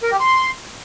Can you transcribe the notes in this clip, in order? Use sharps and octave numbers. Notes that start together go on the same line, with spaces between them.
A#4
G4
C6